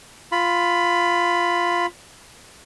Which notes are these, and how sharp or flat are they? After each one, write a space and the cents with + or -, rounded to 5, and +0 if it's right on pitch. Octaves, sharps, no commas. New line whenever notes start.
F4 +0 B5 +10